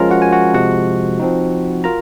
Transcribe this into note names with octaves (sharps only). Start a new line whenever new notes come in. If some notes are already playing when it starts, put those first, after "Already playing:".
Already playing: F3 G#3 C#4 F4 A#4 A#5
F#4 F#5
G#5
F#4 F#5
C3 F3 G#3 F#4 F#5
F3 C4 D#4
F4 A#4 A#5